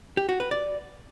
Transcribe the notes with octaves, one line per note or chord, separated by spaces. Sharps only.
G4
F#4
B4
D5